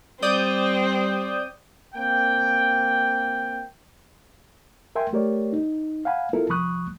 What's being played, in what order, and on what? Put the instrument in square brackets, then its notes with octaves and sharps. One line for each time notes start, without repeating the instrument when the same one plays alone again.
[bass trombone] G3 [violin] C4 [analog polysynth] D5 D#6 G6
[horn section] A#3 C4 G5
[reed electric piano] A#4 E5 G5 G#5 C6
A3 G4 A#4 C#5 D5
D#4
F5 F#5 G#5 B5
B3 E4 F4 A4 A#4
C2 F3 B5 C#6 D#6 F#6